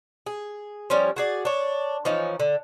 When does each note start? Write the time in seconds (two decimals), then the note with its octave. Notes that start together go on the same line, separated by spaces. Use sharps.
0.26 G#4
0.90 F3 G3 C#4
1.16 F#4 G#4 D5
1.45 D4 C#5
2.05 E3 F3 C#4 D#4
2.40 D3